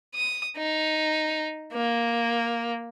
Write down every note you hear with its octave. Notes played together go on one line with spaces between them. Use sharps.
D#6
D#4
A#3